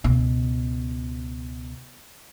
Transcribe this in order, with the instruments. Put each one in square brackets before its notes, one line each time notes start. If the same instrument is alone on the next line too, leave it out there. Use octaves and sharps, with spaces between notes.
[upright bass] C#2 B2